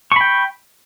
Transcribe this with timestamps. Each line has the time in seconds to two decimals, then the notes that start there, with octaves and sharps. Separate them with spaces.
0.12 C#6
0.16 B5
0.21 G5